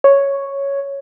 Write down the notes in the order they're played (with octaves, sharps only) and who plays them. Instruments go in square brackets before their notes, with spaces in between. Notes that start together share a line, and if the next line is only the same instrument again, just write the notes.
[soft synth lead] C#5